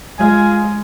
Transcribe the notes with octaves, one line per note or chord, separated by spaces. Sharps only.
G#3 F4 F5 G#5